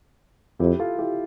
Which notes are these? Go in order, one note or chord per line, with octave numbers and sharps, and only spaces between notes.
F2 E4 G4
F4 A4
E4 G4